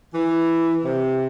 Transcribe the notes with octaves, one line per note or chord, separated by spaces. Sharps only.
E3
C3